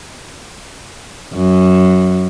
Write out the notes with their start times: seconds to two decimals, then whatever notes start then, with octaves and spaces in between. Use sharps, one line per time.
1.34 F#2